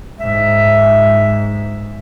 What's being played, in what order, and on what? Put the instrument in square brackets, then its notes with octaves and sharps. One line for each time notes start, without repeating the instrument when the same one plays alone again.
[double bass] G#2 [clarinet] E5